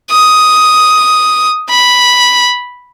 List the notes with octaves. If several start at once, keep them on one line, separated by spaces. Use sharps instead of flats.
D#6
B5